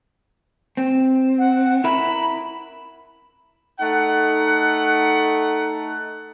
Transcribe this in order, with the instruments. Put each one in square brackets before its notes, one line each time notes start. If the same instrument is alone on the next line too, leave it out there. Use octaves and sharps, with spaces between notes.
[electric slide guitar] C4
[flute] F#5
[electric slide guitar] E4 A#4 E5 [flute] B5
[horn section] A3 D#4 F#5